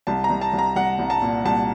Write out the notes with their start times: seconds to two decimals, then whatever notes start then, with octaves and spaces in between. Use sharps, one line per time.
0.07 C2 A5
0.24 A#5
0.30 C2
0.41 A5
0.53 C2
0.58 A#5
0.76 C2 F#5
0.99 C2
1.10 A5
1.22 A#2
1.45 C2 A5